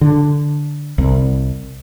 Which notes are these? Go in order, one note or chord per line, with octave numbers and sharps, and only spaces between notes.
D3
C2